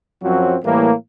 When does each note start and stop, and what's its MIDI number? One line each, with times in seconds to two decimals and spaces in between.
0.23 0.56 42
0.23 0.56 53
0.23 0.56 54
0.23 0.56 60
0.23 0.56 66
0.64 0.92 45
0.64 0.92 52
0.64 0.92 55
0.64 0.92 58